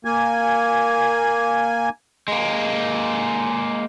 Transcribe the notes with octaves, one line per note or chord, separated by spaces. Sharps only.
A#3 G#5
G#3 A#3